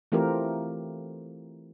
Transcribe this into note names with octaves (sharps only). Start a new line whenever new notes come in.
E3 A3 C4 F4 G4 A#4